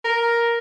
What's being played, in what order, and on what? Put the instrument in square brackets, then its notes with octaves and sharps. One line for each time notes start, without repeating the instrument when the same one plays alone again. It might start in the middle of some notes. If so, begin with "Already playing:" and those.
[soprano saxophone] A#4